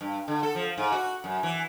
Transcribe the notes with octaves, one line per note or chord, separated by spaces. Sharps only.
G2
D3
A4
F3
G#2
F#4
F#2
E3